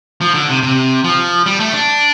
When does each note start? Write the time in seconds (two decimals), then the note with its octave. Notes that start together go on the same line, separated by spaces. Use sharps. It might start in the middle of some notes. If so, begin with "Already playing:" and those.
0.21 F3
0.34 D3
0.49 C3
0.63 C3
1.04 F3
1.46 G3
1.60 A3
1.73 D4